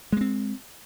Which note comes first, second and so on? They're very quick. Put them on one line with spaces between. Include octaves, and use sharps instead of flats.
G#3 A#3 C4